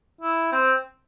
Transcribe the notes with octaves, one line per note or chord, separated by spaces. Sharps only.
E4
C4